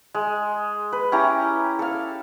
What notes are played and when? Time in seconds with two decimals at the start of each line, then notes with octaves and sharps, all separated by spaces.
0.14 G#3
0.92 B4
1.12 C#4 E4 G4 A#5
1.79 A4 F5